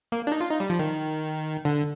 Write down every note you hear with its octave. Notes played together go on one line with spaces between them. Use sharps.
A#3
D4
D#4
F4
D#4
G3
F3
D#3
D3